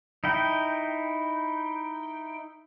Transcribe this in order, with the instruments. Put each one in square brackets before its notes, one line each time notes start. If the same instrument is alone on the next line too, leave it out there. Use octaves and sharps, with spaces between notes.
[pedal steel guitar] D#4 E4 G5